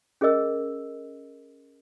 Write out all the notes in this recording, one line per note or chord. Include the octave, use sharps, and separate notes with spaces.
C#4 G#4 A#4 D#5 E6